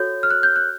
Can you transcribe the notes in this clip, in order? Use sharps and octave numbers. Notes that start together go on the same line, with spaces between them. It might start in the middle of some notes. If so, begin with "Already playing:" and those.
Already playing: F#4 A4 C#5 G6
F6
F#6
G6
F#6